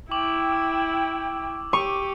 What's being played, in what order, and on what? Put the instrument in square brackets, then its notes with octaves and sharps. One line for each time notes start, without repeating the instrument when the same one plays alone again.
[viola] E4 [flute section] G5 [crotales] C#6 D6 F#7
[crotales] D6 E6
[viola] G4 [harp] C#6 [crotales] C#7 D#7 F7